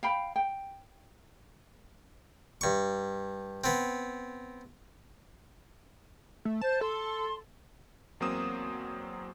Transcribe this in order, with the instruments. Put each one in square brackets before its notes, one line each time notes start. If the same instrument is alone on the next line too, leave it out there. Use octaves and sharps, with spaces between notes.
[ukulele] F5 G5 B5
G5
[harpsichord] G2 C#6
B3 C4
[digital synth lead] A3
[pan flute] C5 [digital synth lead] A5
[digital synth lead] A4 [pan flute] C6
[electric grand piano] E2 F#3 A#3 C4 D#6 E7